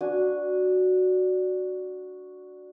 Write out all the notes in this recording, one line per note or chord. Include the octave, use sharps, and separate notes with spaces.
D4 F#4 G#5